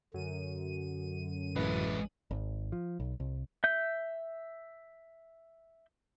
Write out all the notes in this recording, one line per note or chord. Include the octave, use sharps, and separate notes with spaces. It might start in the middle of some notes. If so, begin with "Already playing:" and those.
F#2 D3 D#7
A1 G#3 E4 B4
G#1
F3
B1
C2
E5 G6